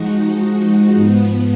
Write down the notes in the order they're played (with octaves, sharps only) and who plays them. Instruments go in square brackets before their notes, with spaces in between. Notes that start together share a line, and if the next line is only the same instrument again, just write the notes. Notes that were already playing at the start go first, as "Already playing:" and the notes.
Already playing: [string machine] F3 G#3 D#4 F#4
G#2 F3 B3